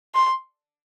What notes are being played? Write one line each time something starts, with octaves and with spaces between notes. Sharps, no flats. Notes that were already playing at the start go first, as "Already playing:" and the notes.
C6